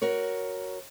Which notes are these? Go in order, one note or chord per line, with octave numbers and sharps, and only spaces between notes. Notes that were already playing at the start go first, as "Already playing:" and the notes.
F#4 A#4 C#5